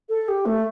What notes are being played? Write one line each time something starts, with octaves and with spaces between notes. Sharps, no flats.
A4
G4
A3